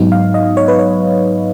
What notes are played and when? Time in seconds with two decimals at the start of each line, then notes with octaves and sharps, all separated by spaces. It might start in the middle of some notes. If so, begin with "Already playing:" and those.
Already playing: G#2 F#3 B3 D#4
0.12 F5
0.34 D#5
0.57 C#5
0.68 B4
0.79 C#5